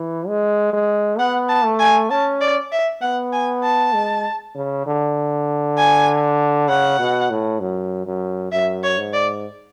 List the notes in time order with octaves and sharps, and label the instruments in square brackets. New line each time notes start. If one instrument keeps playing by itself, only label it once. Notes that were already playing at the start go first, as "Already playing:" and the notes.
Already playing: [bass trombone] E3
G#3
G#3
[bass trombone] B3 [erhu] F#5
[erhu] A5
[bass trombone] A3
[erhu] G#5
[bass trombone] C#4 [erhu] A5
[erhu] D5
E5
[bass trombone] B3 [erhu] F#5
[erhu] G#5
A5
[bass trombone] G#3
C#3
D3
[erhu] G#5
[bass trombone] C#3 [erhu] F#5
[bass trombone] B2
A2
F#2
F#2
[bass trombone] F#2 [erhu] E5
[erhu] C#5
[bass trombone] G#2
[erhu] D5